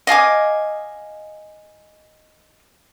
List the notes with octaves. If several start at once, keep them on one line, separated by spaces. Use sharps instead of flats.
D#5 F5 G#5 D6